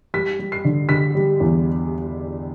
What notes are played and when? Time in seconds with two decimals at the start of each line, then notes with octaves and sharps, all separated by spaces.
0.14 G3 B6
0.39 G3
0.52 C7
0.65 D3
0.89 D3 B6
1.15 G3
1.40 E2